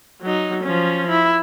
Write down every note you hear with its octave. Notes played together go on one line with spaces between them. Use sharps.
F#3 D#4
F3 C#4
E4